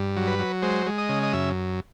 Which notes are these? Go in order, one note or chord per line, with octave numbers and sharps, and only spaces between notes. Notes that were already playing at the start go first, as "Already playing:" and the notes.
Already playing: G2
F#3
B4
F#3
G#3 C5
G#3
D#5
C#3
D#5
F#2 E5